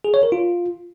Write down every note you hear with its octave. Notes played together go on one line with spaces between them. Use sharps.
G#4
C#5
A#4
F4